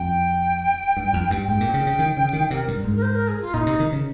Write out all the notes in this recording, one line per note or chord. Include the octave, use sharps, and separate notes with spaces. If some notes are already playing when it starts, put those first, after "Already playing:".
Already playing: F2 G5
G2
F2
G2
G#2 G5
A#2
C#3
C#3
D#3
C#3
D#3
C3 A#4
G2
G#2
A#4
C5
A#4
G#4
F4
A#2 D#4
C3
D#3
C#3